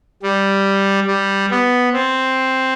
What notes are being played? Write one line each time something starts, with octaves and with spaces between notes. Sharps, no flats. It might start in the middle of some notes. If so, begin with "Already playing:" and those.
G3
G3
B3
C4